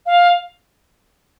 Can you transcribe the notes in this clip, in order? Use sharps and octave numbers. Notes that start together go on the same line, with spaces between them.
F5